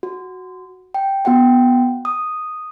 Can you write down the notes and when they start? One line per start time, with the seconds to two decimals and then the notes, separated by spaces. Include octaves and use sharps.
0.03 F#4
0.94 G5
1.25 B3 F#4 F#5 G5
2.05 D#6